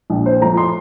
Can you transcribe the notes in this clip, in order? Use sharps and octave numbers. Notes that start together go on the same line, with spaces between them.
A#1
C5
A2 F3 A3 A#5
C6